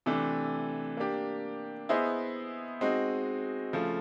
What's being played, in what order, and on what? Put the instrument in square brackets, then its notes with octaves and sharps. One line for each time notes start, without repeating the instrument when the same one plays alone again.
[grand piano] C3 E3 A3 D4
A#3 D4 G4
B3 E4 G#4 C5 D#5
G#3 C4 D#4 F#4
C#3 F3 A3